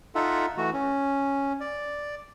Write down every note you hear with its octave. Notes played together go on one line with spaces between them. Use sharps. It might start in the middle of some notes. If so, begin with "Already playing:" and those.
D#4 F4 A4 E5 F#5
E3 A3 F#4
C#4
D5